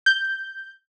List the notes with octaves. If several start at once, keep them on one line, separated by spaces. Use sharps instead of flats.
G6